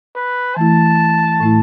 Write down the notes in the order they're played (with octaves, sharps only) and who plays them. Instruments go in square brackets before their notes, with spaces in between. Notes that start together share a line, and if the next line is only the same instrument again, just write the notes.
[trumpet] B4
[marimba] E3 A3 E4 [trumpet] A5
[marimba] A2 A3 E4